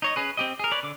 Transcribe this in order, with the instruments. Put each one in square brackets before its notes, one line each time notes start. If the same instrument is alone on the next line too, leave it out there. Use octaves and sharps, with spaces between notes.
[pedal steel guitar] D#4 C#5 D#5
C#4 G#4 B4
C4 G4 D#5
G#4 A#4
B4 C#5 D5
D3 D6